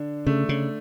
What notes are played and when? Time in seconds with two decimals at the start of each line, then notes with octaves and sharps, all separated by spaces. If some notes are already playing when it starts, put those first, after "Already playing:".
Already playing: D3 D4
0.27 C#3 A3
0.49 C#3